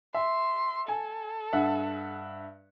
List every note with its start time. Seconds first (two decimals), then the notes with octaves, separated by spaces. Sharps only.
0.14 E5 C6
0.88 A4 G#5
1.53 G2 E5 F#5